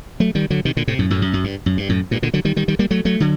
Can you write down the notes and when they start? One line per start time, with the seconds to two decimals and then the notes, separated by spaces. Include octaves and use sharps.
0.20 F#3 A3
0.35 D#3 G3
0.50 D3 F#3
0.65 C3 D#3
0.77 A#2 D3
0.88 A2 C3
0.99 F#2 A2
1.10 F#2 A2
1.22 F#2
1.33 F#2
1.44 G2
1.66 F#2
1.77 G2
1.89 F#2 A2
2.11 G2 A#2
2.22 A#2 D3
2.34 D3 F#3
2.45 D#3 G3
2.56 D#3 G3
2.68 D#3 G3
2.79 G3 A#3
2.91 F#3 A3
3.05 F#3 A3
3.20 D3 F#3